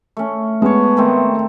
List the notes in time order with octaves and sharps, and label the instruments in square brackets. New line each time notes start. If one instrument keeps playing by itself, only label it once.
[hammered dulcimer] A3 C#4
[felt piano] G#3 [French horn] B3 [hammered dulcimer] C#5 A5
[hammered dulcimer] D#3 A3 C4